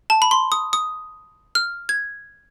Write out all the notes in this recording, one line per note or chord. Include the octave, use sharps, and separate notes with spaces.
A5
B5
C6
D#6
D#6
F6
G#6